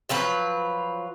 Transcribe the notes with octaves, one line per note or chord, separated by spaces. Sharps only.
F3 F#3 F4 B4